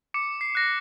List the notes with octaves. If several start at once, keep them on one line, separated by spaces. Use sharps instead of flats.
D6 C#7
C7
F#6 A#6